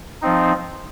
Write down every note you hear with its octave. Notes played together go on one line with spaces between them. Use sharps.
F3 C4 D#4